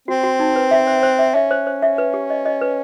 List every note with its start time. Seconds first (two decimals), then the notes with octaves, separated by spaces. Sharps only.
0.08 C4 F#4
0.23 F#4
0.40 D#4
0.56 B4
0.71 E5
0.87 C5
1.03 C5
1.19 E5
1.35 C#4 E5
1.51 C5
1.67 C5
1.83 E5
1.98 B4
2.14 G4
2.30 D#5
2.46 D#5
2.61 B4